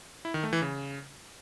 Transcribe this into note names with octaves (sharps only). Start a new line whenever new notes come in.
E4
D#3
A3
E3
C#3